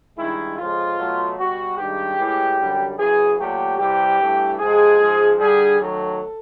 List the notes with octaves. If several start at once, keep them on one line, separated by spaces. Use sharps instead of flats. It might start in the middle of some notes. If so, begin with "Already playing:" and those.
G2 D#3 G#3 E4
F2 C#3 F3 G#3 F4
B2 F#3 A3
B2 G3 F#4
G2 D#3 G#3 G4
A2 E3 G#3
F#2 D3 G3
F#2 C#3 E3 G#4
A#2 F#3 A3 G4
C3 E3 G3 G4
G2 E3 A3
C3 F3 G#3 G#4
G#2 F3 G#3
G2 D3 G3 G#4
F#2 D#3 F#3 A3 A4